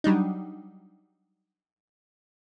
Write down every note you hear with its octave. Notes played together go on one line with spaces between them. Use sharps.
F#3 G3 D4 D#4